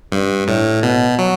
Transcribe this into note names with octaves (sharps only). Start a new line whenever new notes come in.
G2
A2
B2
F#3